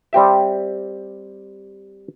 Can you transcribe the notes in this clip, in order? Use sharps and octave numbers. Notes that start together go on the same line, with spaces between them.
G3 C4 G4 E5